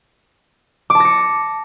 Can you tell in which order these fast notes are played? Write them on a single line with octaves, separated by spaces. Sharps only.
D6 A5 A#6 C#7